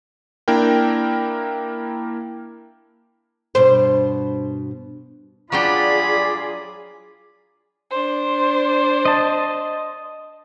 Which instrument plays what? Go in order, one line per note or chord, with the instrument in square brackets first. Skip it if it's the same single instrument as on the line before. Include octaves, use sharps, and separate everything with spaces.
[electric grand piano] A#3 D4 E4 A#4 G5
[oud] G2 B2 C5
[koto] F#3 D4 G5 [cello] F4 G#4 [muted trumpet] D5 [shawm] B5
[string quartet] D4 C5
[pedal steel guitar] D#5 A5